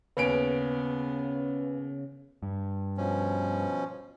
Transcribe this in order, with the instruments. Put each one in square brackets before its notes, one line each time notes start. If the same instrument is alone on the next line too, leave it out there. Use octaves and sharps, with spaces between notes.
[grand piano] D#2 C#4 D7 [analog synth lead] C#3 [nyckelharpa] B3 [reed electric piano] B4
[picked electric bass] G2
[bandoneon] B2 F3 C#4